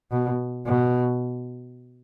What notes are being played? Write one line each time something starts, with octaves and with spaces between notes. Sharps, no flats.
B2
B2